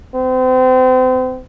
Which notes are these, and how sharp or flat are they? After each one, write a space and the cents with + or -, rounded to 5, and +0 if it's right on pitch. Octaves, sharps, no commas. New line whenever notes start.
C4 -35